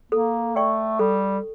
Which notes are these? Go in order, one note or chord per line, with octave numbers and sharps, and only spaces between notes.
A#3 A4
A3 D5 G5 C#6
G3 A4